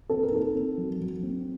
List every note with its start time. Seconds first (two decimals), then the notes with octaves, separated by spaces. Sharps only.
0.09 C4 A4
0.23 A#4
0.32 D#4 A4
0.55 C4
0.78 F#3
1.01 F#3
1.23 C4